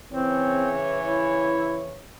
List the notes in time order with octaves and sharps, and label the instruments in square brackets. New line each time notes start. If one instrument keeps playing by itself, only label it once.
[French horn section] C#3 E3 C#5 [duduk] C4
[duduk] E4